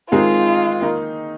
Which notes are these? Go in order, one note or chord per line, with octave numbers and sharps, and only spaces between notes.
D#3 G#3 C4 D#4 F4 G#4
D#3 A#3 D#4